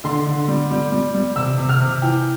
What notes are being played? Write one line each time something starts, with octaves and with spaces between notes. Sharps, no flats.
D3 C6
D3
G3
G3
G3
G3
C3 E6
C3
F6
C3
E3 G5